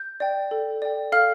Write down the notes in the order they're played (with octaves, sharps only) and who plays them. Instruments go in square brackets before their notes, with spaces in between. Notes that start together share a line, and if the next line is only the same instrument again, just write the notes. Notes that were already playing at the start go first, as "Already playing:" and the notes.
Already playing: [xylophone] G6
D5 G5
A4
D5 G5
A4 F5 F6